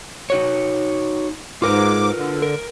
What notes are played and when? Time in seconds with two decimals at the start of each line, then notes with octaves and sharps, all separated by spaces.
0.30 D#4 F#4 C#5
1.62 G#2 F4 A#4 B4 D6
2.16 D3
2.42 A#4